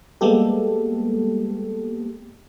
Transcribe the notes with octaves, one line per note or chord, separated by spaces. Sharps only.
G3 G#3 A#3 B3 G4 A4